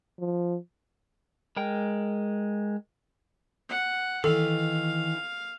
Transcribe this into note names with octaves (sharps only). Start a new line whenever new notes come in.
F3
G#3 A#4 G5
F#5
D#3 E3 A4 F5